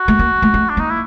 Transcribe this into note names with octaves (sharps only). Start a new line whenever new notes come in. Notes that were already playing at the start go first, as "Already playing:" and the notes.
Already playing: F#4
A3
A#3
A3
A3
D4
A#3 D#4
E4